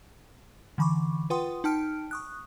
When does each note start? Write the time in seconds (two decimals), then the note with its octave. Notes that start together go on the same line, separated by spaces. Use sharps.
0.78 D3 E3 B5 C#6 D6
1.30 F4 B4 F#5 G5 C6 D#6
1.64 D#4 G5 A5 F6 D7
2.11 C#6 D#6 F#6